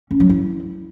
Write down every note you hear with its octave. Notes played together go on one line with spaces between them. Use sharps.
C#4
F#3
E4